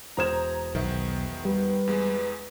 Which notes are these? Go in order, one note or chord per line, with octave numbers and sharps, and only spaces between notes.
E1 C5 A#5 D#6 G#6 E7
B1 D#3 B3 E5
G3 B4
E2 G#3